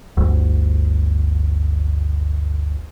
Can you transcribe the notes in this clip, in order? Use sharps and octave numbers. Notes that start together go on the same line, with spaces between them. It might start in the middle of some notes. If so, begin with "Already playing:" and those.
G1 D2